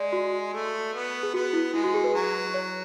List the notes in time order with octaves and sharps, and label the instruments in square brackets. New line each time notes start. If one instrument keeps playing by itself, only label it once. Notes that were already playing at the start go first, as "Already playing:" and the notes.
Already playing: [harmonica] G#3 [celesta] D5
[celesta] F#4
[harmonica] A3
B3
[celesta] G#4
[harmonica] B3 [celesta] F#4
[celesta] E4
[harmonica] G#3 [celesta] E4
[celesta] F#4
G#4
B4
[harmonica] F#3
[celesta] C#5